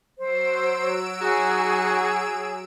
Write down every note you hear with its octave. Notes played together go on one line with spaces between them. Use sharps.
F#3 C5 E6 D7
D#4 F#4 G#4